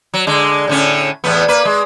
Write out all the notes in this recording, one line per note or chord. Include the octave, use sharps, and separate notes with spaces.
F#3
D3 G#3
A2 D3 C#4
E2 A2 B3
A#3 B4
G#3